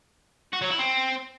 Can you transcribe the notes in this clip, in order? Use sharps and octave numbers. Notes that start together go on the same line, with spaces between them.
F#4
F#3
E4
C4